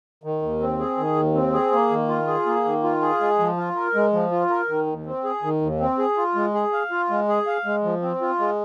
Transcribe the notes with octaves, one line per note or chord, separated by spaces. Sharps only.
D#3
D#2
C4
G#4
D#3
D#2
C4
G#4
A#3
D#3
F4
G#4
A#3
D#3
F4
G#4
G#3
F3
F4
A#4
G#3
F3
F4
A#4
D#3
D#2
C4
G#4
D#3
D#2
C4
G#4
F4
G#3
G#4
F5
F4
G#3
G#4
F5
G#3
F3
C4
F4
G#3